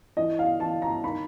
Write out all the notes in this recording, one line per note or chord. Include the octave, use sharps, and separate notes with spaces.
E3 D#5
F5
E3 A5
A#5
D#3 B5